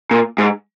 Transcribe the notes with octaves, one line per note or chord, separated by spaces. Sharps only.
A#2
G#2